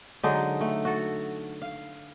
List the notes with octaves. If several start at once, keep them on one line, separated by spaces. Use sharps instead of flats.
D3 F#3 G#3 D#4
A3
F#4 A4
F5